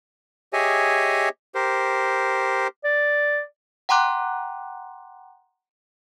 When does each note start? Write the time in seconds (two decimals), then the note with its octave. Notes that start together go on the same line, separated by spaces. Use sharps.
0.53 G4 G#4 C#5 D#5 E5 G#5
1.55 G4 A#4 C5
2.84 D5
3.89 F#5 G5 A#5 C6 D6 F#6